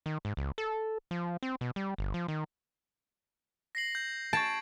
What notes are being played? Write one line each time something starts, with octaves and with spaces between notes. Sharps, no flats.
D#3
G#2
C#2
A4
F3
C4
B2
G3
G1
F3
D#3
A#6 C7 F#7
G6
A5 C#6 G#6 D7